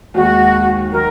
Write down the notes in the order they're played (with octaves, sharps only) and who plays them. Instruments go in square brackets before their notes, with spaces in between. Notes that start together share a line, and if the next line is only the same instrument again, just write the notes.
[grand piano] D#2 D#3 G#3 [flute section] F#4
[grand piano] D#3 F#3 D#4 [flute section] A#4